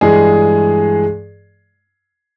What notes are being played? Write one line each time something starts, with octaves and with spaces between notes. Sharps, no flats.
G2 E3 G#3 G#4